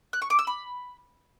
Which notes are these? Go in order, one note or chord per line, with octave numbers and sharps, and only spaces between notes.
F#6
C#6
D6
E6
B5